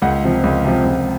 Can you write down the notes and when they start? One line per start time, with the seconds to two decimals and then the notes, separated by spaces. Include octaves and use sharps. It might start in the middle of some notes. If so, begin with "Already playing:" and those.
0.02 C#2 F#5
0.24 C3 F3
0.43 C#2
0.65 C3 F3
0.85 C#2